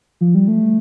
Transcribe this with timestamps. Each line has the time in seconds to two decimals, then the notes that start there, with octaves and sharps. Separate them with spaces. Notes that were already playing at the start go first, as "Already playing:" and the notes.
0.21 F3
0.35 G3
0.48 A3